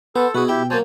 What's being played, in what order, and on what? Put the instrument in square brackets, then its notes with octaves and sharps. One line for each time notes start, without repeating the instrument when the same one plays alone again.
[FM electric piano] B3 [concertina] A4 [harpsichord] C5
[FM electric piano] B2 [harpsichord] E4 G#4 [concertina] F#4 B4
[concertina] E4 G4 [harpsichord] E5 G5
[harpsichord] F#3 A#3 [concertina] C5 G#5 A5